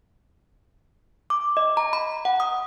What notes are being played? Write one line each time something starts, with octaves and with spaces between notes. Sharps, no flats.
D6
D#5
A#5
B5
F#5
D#6